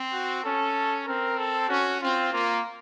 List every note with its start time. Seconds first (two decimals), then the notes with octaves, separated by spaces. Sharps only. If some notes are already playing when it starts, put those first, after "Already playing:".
Already playing: C4
0.12 F#4
0.44 C#4 A4
1.06 C4 A#4
1.38 A4
1.69 C#4 F#4
2.01 C4 F4
2.32 A#3 F4